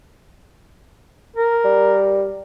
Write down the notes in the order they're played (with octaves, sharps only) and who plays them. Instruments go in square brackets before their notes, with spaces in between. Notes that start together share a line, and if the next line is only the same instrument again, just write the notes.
[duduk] A#4
[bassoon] G3